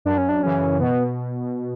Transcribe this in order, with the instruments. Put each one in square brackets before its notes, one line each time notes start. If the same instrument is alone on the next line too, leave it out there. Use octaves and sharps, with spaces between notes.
[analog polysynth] F#2 [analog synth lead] D4
[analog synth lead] C#4
D4
[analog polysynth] C#3 E3 [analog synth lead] C#4
[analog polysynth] B2 [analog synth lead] B3